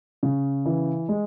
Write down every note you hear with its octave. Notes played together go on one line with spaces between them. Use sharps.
C#3
E3
G#3